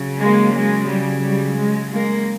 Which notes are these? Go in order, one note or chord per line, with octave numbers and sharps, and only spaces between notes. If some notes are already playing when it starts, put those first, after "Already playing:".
Already playing: C#3 F#3
G#3 A#3
G#3
G3
G3
G#3
G#3 A#3